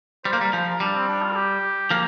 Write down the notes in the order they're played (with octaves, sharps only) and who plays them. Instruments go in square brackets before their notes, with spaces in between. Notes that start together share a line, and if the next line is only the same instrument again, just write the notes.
[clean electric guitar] G3 [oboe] C5
[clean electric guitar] A#3
[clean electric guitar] G3 [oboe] A#4
[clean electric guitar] F3 [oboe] C5
[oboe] A#4
[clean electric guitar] G3 [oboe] D4
[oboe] C4
D4
F4
A#4
G4
[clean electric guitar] F3 A#3